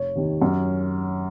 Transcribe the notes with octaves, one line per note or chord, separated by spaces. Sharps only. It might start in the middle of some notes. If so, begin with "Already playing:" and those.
Already playing: F1 C#5
D#2 D#3
F#2